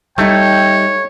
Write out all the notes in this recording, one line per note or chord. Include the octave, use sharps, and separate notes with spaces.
G3 A3 D#4 C#5 G5